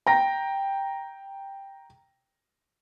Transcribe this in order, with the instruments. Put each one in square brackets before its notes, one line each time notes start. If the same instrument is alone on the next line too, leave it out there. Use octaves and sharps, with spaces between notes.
[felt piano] G5 A#5 A#6